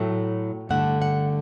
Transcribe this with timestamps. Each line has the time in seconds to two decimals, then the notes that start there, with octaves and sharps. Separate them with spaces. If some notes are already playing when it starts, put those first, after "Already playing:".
Already playing: A2 F#3 A3 G5
0.69 G2 D3 A3 F#5
1.02 F#5